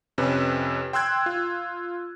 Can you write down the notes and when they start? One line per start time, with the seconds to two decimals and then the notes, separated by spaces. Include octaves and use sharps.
0.18 F2 C3 C#4 B4
0.93 G5 C6 E6 F#6 G#6
1.26 F4